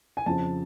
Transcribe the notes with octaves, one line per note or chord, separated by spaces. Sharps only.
G#5
F2 C#3 F3 A5